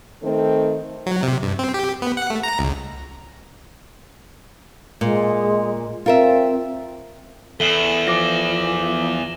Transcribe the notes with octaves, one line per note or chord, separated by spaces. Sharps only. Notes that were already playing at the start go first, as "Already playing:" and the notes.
D#3 A3 C4 A4
F#3
C3
G2
C4
G4
B3
F#5
A3
A#5
C#2
A#2 G#3
C4 F4 A#4 E5
E2 A4 E5 E7 F#7 G7
F3 D6 A#6